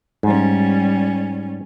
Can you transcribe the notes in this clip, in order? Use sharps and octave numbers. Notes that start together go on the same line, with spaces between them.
G#2 G3 C#4